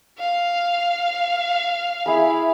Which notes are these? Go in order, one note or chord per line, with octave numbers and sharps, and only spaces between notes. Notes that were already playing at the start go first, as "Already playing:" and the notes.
F5
E4 G#4 B5